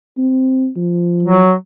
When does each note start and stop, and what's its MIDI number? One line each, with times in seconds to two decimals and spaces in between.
0.18 0.69 60
0.76 1.41 53
1.23 1.53 54